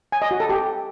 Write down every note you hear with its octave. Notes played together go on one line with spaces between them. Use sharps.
G#5
D#5
F#4
A4
G4